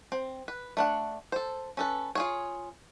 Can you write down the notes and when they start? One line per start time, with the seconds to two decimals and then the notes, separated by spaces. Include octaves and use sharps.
0.12 C4
0.48 B4
0.77 A3 D4 F#5
1.32 A4 C5
1.77 C#4 A4 B4
2.15 F4 G#4 C#5